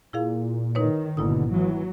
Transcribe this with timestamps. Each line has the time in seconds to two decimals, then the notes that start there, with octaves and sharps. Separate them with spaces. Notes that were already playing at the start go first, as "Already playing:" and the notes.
0.13 A#2 E4 G#4 F5
0.75 D#3 D#4 B4 C#5
1.17 G#1 B2 D3 A#3 E4 D#6
1.53 E3 F#3